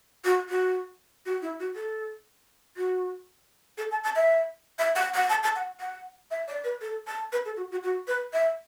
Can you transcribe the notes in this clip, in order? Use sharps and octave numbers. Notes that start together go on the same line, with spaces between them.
F#4
F#4
F#4
E4
F#4
A4
F#4
A4
A5
A5
E5
E5
F#5
F#5
A5
A5
F#5
F#5
E5
D5
B4
A4
A5
B4
A4
F#4
F#4
F#4
B4
E5